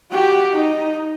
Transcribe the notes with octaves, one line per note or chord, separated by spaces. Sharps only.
F#4 G4
D#4